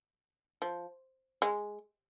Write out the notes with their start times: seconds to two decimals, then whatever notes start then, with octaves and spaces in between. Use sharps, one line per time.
0.62 F3
1.42 G#3